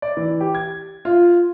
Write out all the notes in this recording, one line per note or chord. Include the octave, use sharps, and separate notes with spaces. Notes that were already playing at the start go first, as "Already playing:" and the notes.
D5
E3
G4
G#6
F4